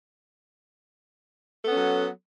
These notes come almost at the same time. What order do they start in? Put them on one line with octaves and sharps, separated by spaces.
A4 B3 C#4 F#3